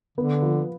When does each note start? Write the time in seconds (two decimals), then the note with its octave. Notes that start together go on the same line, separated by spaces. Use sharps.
0.18 D3 B3
0.42 F3